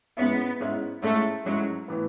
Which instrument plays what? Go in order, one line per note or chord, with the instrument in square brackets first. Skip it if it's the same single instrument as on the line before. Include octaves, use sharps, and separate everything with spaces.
[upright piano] G#2 G#3 C#4 E4 [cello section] B3
[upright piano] G#2 G#3 C#4 E4
[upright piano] G#2 G#3 C#4 E4 [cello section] A3
[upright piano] G#2 G#3 C#4 E4 [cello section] F#3
[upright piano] A2 E3 B3